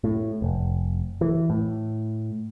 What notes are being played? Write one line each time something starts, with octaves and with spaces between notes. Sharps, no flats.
A2
F1
E3
A2